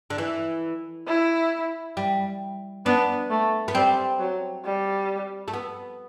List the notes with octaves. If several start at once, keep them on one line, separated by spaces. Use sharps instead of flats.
D3
E3
E4
G3
B3 D4
A3
B3
G3 C4
F#3
G3
A3
B3